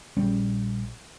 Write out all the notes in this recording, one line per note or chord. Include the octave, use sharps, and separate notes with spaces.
A#1 G3 C#4